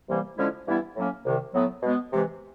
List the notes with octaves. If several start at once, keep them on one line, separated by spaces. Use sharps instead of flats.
C2 C3 E3 G3 A#3
D3 F3 G#3 C#4 E4
G2 E3 G3 B3 E4
A2 F#3 A#3 C#4
C2 C3 D#3
A2 F#3 B3
B2 G#3 B3
C3 E3 G#3